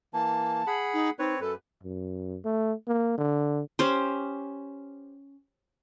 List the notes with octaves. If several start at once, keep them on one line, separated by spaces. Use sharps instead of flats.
E3 A#3 A5
G#4 F#5 B5
D#4
C4 D#4 B4 C#5
F#2 A4 B4
F#2
A3
A#3
D3
C#4 G4 C5